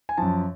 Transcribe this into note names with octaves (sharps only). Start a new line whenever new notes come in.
G#5
F#2 F3 A5